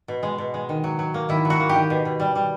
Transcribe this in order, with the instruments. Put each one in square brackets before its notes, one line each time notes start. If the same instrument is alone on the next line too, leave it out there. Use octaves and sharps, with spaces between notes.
[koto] B2
G#3
B2
G#3
D#3
F#3
F#3
A#3
D#3 E4
F#3
F#4
A#3
G4
D#3
B2
B2
G3
G3